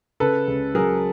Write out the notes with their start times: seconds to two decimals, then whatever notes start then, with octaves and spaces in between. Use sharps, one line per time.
0.20 C#3 A4 B4
0.48 C#2
0.75 F#3 G#4 A#4